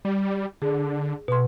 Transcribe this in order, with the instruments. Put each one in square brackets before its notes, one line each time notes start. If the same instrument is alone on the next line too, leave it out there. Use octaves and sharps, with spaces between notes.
[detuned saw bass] G3
[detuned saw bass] D3 [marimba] G#4
[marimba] B2 C6